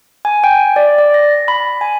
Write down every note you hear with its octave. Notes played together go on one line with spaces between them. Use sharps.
G#5
G5
D5
D5
A#6
B5
G#5